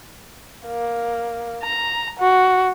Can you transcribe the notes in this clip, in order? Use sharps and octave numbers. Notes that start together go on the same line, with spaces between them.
A#3
A#5
F#4